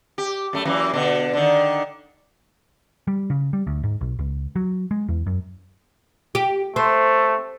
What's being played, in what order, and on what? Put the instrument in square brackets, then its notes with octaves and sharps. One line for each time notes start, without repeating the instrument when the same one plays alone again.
[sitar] G4
F#2 A3
F#2 E3 A#3
B2 D3
D3 D#3
[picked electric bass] G3
C#3
G3
D2
G#2
B1
C#2
F#3
G#3
E2
F#2
[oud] G4
[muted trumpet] A3 [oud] C4